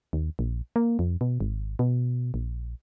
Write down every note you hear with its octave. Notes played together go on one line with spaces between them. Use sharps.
D#2
A#1
A#3
F2
B2
G#1
B2
A#1